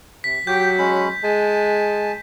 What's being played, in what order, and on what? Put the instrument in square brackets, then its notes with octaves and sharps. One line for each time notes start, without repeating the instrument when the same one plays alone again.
[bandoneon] C3 [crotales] B6
[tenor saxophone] F#3 [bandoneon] G4 G5 [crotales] G6
[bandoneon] G#3 C#4 B5
[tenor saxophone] G#3 [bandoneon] G#5 A5